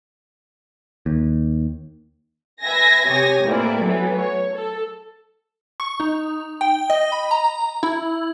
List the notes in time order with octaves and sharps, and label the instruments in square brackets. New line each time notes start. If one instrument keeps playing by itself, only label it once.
[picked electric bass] D#2
[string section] B4 E5 G#5 A#6
C3 G4 C#5 G#5 D#6 A#6
F2 A2 E3 A#3 E4 D5
E3 F#3 A3 B3
C#5
A4
[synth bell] C#6
D#4
G5
D#5
B5
A#5
E4